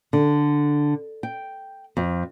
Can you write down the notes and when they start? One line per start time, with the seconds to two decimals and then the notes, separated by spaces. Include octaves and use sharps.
0.13 D3
1.23 G5
1.97 F2